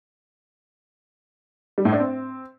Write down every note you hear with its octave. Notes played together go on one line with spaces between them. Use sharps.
G3
A2
D4
C4